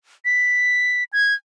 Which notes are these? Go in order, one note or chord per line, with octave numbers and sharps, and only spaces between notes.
B6
G#6